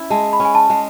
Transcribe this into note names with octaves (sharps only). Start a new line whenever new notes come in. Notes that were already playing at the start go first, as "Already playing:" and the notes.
Already playing: C#4 E4
G#3 A5
B5
C#4
G#5
A5
G#3